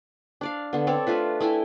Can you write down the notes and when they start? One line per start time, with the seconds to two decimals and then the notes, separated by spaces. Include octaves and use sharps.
0.41 D4 D5 F5
0.73 D3 B3
0.87 C4 A4 C#5 D5
1.07 A3 D4 F4 B4
1.40 A3 E4 G5 G#5